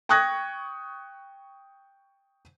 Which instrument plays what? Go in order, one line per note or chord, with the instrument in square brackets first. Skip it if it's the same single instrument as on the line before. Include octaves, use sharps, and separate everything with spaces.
[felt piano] G5 C#6 D#6 F#6 G#6 A#6